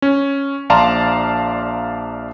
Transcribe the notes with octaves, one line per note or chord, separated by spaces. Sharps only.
C#4
A#1 D5 F5 A5 A#5 C6